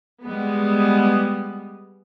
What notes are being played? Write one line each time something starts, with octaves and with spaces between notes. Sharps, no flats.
G3 G#3 B3